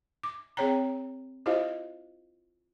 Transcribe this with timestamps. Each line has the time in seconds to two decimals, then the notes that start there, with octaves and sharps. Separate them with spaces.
0.23 D6
0.57 C4 G#4 C#5 G5 A#5
1.46 E4 F4 G4 C5 D#5 F5